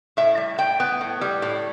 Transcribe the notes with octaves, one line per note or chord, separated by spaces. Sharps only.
A2 E5
G3
A2 G5
B3
A2
G3
A2